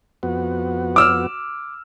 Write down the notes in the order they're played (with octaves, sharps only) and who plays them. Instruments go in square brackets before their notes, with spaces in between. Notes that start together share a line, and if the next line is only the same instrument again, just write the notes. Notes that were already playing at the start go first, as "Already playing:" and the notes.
[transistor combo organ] F2 B3 F#4
[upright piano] D6 E6 F6